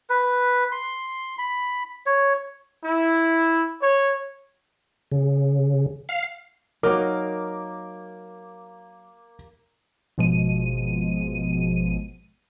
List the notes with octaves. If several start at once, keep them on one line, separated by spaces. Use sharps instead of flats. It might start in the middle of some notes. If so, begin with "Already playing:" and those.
B4
C6
B5
C#5
E4
C#5
C#3
F5
F#3 A#3 D#4 A#4 D6
G#1 B2 F3 G#3 D#7